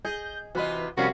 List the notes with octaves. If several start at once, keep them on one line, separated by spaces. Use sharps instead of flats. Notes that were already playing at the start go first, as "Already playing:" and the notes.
G#4 D#5 G6
C3 E3 F4 F#4 B4 D#5
C3 F3 G3 C#4 F#4 A#4 F5